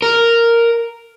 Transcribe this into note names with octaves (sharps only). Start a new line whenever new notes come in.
A#4